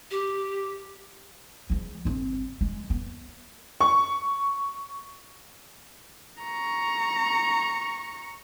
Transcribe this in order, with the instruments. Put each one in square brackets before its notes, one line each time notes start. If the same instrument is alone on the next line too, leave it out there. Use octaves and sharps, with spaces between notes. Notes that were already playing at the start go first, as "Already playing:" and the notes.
[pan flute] G4
[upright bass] F3 G#3
G1 C4
G#3
B3
[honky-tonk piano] C#6
[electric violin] A#5 C#6